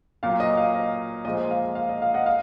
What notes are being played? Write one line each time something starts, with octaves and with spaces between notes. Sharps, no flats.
A#2 F#3 F5
D#5
F5
D#5
A#2 F3 G#3 D#5
F5
F5
D#5
F5
D#5 F#5
F5